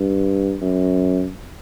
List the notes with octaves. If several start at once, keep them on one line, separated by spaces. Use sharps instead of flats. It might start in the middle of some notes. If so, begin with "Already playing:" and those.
Already playing: G2
F#2